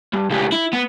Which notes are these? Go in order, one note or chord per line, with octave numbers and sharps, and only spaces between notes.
G2
C#2 G3
E4
B3